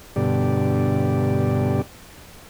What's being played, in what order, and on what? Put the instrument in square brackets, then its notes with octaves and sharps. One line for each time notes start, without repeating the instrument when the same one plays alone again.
[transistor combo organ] G2 B2 D3 G4 D5